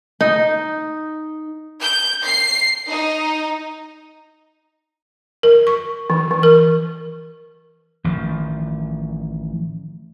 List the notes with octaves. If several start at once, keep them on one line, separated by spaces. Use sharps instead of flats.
D#4
G6
C7
D#4
A#4
C#6
E3
E3
A#4
A1 D#3 F3